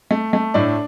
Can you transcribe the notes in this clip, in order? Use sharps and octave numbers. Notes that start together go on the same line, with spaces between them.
A3
A3
A2 D4 D5